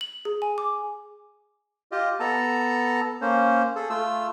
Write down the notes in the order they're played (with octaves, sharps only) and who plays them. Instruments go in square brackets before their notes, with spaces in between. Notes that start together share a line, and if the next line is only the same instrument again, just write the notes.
[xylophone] F#7
G#4
G#5
D6
[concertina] F4 G4 D#5
B3 A4 A5 A#5
A#3 C#4 C5
G#4 A4
A3 F4 E6